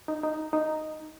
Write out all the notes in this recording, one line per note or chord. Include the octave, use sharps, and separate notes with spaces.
D#4
D#4
D#4